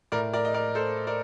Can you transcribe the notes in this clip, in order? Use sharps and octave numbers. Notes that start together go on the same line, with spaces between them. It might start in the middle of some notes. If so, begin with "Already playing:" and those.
A2 A#4 D5
A#4 D5
D#5
A#4 D5
A4 C5
A#4 D5